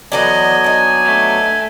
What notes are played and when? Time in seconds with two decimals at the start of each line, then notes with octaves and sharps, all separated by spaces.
0.12 E3 F#3 B3 A4 D5 D#5 G#5
0.64 D4 D#4
1.05 A3